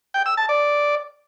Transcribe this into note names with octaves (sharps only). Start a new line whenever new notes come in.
G5
E6
A5
D5